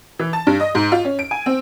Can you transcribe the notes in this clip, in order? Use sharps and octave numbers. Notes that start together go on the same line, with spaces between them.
E3
A5
G2
D#5
G#2
F4
C#4
D7
G#5
C4